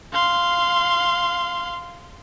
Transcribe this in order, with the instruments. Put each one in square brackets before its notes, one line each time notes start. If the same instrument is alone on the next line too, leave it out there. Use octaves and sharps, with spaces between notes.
[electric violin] F5 C6